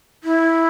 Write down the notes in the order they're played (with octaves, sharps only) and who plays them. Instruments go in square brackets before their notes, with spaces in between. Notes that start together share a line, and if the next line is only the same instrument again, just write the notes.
[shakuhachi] E4